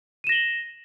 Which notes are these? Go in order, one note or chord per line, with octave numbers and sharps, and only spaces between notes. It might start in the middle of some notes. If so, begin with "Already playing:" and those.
A#6 D#7 E7 F#7 G7